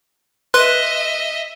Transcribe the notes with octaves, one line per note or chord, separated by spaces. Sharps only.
B4 D#5 E5 C6 F#6